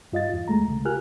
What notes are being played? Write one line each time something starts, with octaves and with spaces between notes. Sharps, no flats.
G2 F4 D#5 F5 A6
E2 F4
D#2 G#3 A3 A#5
C2 C#3
F4 G4 A#4 G#5 F6 F#6